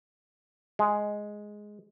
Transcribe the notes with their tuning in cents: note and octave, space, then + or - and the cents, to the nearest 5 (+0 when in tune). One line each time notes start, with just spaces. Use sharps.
G#3 +5